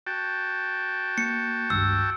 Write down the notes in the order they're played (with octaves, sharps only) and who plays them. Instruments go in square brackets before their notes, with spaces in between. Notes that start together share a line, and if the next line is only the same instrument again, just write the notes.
[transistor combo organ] F#4 G5 A5
[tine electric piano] A#3 [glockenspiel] C#7
[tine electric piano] G#1 C#2 G2 [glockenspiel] E6